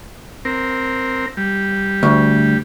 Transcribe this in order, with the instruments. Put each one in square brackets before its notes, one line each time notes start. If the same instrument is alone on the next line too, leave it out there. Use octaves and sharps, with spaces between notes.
[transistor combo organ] C4 A#4
G3
[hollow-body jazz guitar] D2